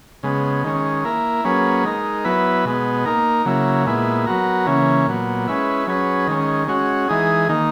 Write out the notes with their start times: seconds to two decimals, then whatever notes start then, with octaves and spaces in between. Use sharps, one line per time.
0.23 C#3 G#3 B3
0.64 D#3 G#3 C#4
1.04 A#3 E4 A#4
1.44 F#3 A#3 C#4 G#4 B4
1.84 G#3 D#4 A#4
2.25 F#3 B3 E4 B4
2.65 B2 G#3 B3
3.05 A#3 D#4 A#4
3.45 C#3 F#3 A#3 E4
3.86 A#2 G#3 B3 E4
4.26 F#3 B3 F#4 A#4
4.66 C#3 E3 A#3 C#4
5.07 A#2 F#3 B3
5.47 G#3 C#4 E4 B4
5.87 F#3 C#4 G#4 B4
6.27 D#3 G#3 C#4
6.68 G#3 C#4 F#4
7.08 E3 G#3 D#4 G#4
7.49 D#3 A#3 D#4